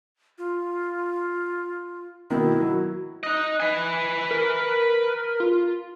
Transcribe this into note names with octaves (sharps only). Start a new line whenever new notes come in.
F4
B2 D#3 E4
F#3
D#4 D#5 F#6
B4 G#5
A#4
F4